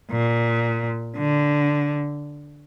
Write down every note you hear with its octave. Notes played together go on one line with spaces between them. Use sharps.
A#2
D3